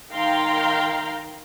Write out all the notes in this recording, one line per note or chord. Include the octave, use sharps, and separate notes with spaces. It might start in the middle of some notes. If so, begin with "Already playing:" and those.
D#3 F5 G5 A#5 C6